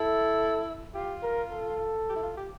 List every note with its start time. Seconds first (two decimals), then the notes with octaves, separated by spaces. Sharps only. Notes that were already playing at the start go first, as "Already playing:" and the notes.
Already playing: E4 A4
0.94 F4 G4
1.23 A#4
1.52 A4
2.09 G4
2.16 E4
2.23 F4
2.37 G4